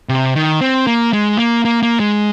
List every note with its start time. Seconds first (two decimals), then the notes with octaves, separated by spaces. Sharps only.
0.09 C3
0.35 D#3
0.61 C4
0.87 A#3
1.13 G#3
1.39 A#3
1.65 A#3
1.83 A#3
2.00 G#3